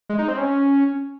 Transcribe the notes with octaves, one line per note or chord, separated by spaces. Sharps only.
G#3
D#4
C4
C#4